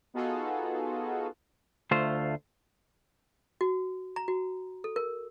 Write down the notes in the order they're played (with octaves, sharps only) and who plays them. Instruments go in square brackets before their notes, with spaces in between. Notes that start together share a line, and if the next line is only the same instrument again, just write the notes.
[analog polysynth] B3 D#4 F4 F#4 G#4 A4
[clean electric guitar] D2 A3 F4 C5
[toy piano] F#4
A#5
F#4
A4
A#4